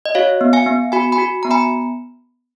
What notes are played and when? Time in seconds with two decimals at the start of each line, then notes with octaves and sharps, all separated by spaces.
0.06 D#5
0.15 F#4 C#5 F5
0.41 B3
0.53 F5 G#5
0.66 B3
0.92 F#4 G#5 B5
1.12 G#5 B5
1.18 F#4
1.43 B3 A#5
1.51 G#5 B5